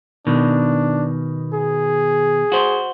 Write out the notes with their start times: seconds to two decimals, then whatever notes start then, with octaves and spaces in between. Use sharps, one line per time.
0.27 B2 D#3 D4
1.54 G#4
2.52 F#4 C5